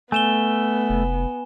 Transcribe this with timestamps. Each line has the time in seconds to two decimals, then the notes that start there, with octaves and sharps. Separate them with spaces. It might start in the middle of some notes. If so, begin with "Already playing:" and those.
0.12 A3 B3 G#5 E7 G7
0.89 F1